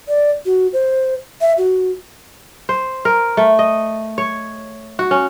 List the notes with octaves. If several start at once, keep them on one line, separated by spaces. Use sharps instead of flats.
D5
F#4
C5
E5
F#4
C5
A#4
A3
D#5
C#5
F#4
C#4